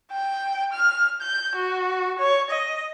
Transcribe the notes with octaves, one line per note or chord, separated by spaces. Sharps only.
G5
F6
G6
F#4
C#5
D#5